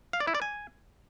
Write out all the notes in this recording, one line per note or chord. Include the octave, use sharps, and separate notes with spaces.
F5
D5
E4
D5
G#5